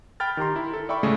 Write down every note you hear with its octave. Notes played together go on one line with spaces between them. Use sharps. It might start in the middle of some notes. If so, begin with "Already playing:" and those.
G5 B5 F6 A6
D#3 G4 A#5 C6
E4
A4
D5 E5 G5 B5 C#6
A2 C#3 G#3 A3